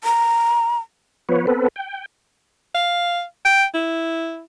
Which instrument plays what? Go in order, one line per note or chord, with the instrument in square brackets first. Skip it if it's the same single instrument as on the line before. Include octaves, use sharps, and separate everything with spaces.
[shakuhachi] A#5
[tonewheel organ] F3 B3 B4 C#5
B3 C4 A4 B4
G5
[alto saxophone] F5
G5
E4